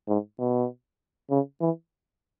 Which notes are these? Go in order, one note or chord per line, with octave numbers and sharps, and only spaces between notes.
G#2
B2
C#3
E3